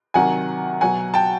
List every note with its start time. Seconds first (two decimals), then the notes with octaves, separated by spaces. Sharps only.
0.14 C3 D#3 F#3 F#5 G#5
0.81 B2 F#3 F#5 G#5
1.14 G5 A5